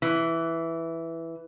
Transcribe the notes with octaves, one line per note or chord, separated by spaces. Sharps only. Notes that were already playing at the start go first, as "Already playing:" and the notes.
E3